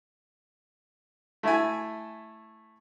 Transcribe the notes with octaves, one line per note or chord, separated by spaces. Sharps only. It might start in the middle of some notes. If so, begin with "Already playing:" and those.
A3 E4 E5 G#5